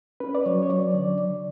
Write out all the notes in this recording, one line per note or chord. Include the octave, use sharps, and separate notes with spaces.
C#4 B4
D5
F#3 C#5
C#5
F#3 D5
D3 D5